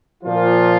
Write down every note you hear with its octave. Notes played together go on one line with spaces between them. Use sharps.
A#2 F3 F4